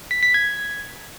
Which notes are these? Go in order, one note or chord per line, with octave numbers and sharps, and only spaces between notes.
B6
B6
G#6